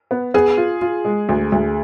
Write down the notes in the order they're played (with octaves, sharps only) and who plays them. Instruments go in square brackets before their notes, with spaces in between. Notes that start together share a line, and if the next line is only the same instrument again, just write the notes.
[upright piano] B3
[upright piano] B3 [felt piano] G#4
[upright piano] F4
F4
G#3
D2
D2